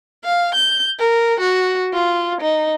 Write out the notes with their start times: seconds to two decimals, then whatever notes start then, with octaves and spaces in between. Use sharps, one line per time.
0.25 F5
0.55 G6
0.99 A#4
1.40 F#4
1.93 F4
2.41 D#4